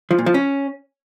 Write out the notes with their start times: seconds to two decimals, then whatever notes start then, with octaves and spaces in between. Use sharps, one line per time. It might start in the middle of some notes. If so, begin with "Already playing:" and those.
0.11 F3
0.19 A#2
0.26 F3
0.34 C#4